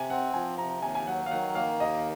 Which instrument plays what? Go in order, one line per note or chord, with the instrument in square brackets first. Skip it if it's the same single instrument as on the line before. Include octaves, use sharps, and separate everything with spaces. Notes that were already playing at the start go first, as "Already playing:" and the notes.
Already playing: [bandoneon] C3 [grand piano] G#5
[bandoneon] C4 [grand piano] F#5
[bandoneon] F3 [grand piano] G#5
[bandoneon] C3 [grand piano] A#5
[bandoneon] D#2 [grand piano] G#5
[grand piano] G#5
[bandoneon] F#3 [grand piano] F#5
[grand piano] F5
[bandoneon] D#3 [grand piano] F#5
[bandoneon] A#3 [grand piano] F5
[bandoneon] D#2 [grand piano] D#5